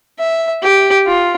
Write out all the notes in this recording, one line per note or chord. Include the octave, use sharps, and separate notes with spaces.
E5
G4
F4